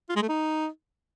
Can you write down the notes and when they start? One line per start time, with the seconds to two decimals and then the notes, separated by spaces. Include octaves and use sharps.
0.09 F4
0.16 G#3
0.22 A3
0.29 D#4